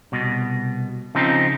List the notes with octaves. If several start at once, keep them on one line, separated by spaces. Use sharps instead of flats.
C2 B2
C#3 F3 C4 D#4